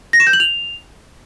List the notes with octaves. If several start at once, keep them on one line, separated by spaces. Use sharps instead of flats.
A#6
E7
G6
F#7
F7